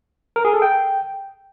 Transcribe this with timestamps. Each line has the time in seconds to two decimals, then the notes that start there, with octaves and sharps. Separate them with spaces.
0.36 A#4
0.45 G#4
0.53 A4
0.62 G5